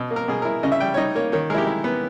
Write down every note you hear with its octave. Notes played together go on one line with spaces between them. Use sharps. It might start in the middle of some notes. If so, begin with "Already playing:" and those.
Already playing: B2
A#3
A#4
B2 G#4
A#4
E4
C#3 D#5
E5
G3 G5
C#5
D#4 D#5
A#3 C#5
D#3 C#5
G#3 E4 A#4
G4
E4
B3